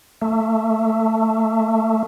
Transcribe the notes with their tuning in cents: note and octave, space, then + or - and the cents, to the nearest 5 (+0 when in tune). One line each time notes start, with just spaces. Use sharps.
A3 +15